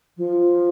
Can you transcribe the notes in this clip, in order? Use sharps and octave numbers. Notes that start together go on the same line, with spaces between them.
F3